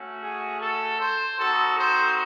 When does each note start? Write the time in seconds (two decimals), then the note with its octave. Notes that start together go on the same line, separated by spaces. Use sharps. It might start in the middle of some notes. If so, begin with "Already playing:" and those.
Already playing: A3 C#4 F#4
0.21 G#4
0.60 A4
1.00 C5
1.38 C4 D#4 F#4 A4
1.77 C5